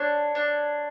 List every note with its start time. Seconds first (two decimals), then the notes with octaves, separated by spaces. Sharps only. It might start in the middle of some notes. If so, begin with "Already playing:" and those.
Already playing: D4 C#5
0.35 D4